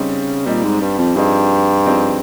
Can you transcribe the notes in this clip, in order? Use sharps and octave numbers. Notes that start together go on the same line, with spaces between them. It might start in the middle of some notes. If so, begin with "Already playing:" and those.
Already playing: C#3 G3 C4 D#4
A#2 G3 C4 D#4
G#2
G2
F2
G2 F3 C4 D#4 G#4
F3 C4 D#4 G#4